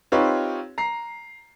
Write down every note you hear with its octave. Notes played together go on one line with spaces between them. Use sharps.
C4 D#4 F4 G4 B4 C#5
A#5 C7